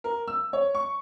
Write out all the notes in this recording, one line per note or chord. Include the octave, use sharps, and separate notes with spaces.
A#4
E6
C#5
C#6